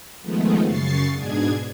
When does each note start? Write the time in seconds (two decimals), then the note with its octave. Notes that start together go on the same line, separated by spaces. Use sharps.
0.21 D#3 F3 G#3 A3 B3
0.63 F#2 C#3 C#6 A6 C7
1.14 G#2 B2 D4 G#4 G#6